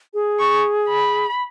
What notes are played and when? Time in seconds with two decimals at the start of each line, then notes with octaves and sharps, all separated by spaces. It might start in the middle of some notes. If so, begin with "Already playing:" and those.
0.14 G#4
0.39 C#6
0.89 B5